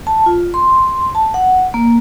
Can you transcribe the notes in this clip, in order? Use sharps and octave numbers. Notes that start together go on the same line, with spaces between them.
A5
F4
C6
A5
F#5
A#3